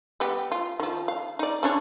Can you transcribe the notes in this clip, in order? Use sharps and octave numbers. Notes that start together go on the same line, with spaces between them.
G3 B3 G4
F4
D#3 F3
F5
D#4 D5
C#4 D4 C#5